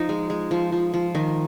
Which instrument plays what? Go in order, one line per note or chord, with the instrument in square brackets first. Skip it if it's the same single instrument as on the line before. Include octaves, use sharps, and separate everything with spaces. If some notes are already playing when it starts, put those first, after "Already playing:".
Already playing: [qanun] F3 D#4
G#3
G#3
F3
F3
F3
D#3